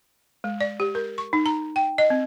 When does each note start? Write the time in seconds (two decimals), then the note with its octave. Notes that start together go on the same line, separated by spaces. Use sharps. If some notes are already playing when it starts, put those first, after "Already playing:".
0.44 G#3
0.61 D5
0.80 G4
0.95 A#4
1.18 C#6
1.33 D#4
1.46 A#5
1.76 G5
1.98 D#5
2.10 C4